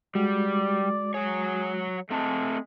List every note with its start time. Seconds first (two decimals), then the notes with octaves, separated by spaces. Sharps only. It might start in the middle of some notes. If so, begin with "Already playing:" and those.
0.15 G3 G#3 F#4 D5
1.14 F#3 G#4 C#5
2.11 G#3 A3 C4 A5